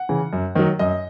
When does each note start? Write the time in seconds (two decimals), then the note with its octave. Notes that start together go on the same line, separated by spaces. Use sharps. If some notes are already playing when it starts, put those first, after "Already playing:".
Already playing: F#5
0.09 C#3 E3
0.33 F#2
0.55 D#3 F#3
0.79 F#2 D#5